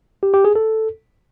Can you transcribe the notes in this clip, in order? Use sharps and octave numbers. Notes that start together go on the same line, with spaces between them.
G4
G4
G#4
A4